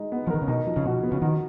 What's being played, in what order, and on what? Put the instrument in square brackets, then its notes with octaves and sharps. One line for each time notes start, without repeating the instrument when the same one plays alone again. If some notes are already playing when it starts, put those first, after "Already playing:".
Already playing: [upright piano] G#3 D#4
B3
[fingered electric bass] F3
[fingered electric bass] D#3 [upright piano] A#4
[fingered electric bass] C#3
[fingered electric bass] B2 [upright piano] D#4
[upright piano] F3
[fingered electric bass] C#3
[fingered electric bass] B2 [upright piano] F#4
[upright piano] B3
[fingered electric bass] C#3
[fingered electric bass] D#3 [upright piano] F#4